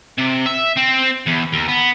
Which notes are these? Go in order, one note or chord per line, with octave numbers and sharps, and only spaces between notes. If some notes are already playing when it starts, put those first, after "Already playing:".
C3
E5
C4
E2
D#2
B3